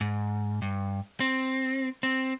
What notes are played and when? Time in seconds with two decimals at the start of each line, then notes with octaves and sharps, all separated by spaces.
0.01 G#2
0.62 G2
1.20 C4
2.03 C4